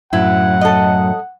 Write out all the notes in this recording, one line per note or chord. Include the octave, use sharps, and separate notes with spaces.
F#2 A2 F#3 E4 F#5
A4 D#5